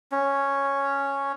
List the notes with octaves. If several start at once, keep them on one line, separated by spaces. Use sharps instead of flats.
C#4